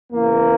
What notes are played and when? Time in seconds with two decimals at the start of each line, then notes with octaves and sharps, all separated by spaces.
0.12 E2 C#3 E3 A#3